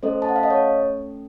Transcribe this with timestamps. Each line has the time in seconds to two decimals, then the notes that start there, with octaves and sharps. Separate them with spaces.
0.03 A3 C#4 A4 C5 D#5
0.22 A5
0.29 F#5
0.36 F5
0.43 D#5
0.50 C#5